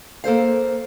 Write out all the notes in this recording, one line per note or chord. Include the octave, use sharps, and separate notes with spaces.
A#3 A4 C5 F5